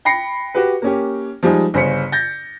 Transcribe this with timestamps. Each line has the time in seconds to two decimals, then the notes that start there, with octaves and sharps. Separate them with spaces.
0.05 G5 B5 A#6 C7 C#7
0.54 F#4 G4 B4
0.82 A#3 C#4 G4
1.43 F3 G3 G#3 D#4
1.74 G1 C#3 C#4 C5 B6 C#7
2.12 G6 A6 A#6